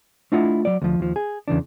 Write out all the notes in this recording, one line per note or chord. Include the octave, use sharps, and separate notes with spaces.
A3 D4 E4 F4 D#5 F#5
F#3 D5
D2 F3
D#2 F3
G#4
E2 C#3 E3 D4